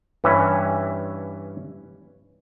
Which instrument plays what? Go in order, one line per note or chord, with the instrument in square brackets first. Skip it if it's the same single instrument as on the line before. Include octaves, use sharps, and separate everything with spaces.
[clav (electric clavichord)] G2 E3 C#4 E5